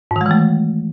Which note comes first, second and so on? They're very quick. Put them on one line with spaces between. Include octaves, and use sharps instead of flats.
G#2 D#3 G#3 E3 A3